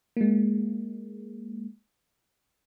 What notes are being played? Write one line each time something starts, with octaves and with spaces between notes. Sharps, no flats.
G#3 A#3